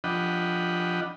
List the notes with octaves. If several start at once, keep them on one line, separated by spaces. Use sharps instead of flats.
F3 D4 D#5 F#5 G5 B5